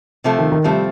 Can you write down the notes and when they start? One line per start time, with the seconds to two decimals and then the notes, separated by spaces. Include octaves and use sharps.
0.24 C3 F3 A3 C4
0.39 D#3
0.52 D#3
0.64 C3 F3 G3 A3 C4